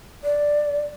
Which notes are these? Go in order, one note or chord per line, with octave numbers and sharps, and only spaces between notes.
D5